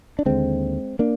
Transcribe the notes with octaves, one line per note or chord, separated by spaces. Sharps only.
D4
D#2 D3 G#3 C4
A#3 D4